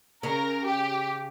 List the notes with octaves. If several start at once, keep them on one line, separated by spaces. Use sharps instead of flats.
C#3 A#4
G4